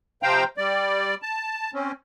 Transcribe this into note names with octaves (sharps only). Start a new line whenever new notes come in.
C3 F3 C5 F5 G5 A#5
G3 D5
A5
C4 C#4